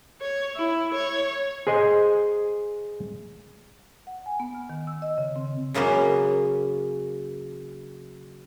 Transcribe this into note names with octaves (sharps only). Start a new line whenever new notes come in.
C#5
E4
C#5
G#4 C5 D#5 G#5
F#5
G#5
B3
F6
D#3
E6
D#5
C#3
C4
F#2 C#3 A#3 B3 C#4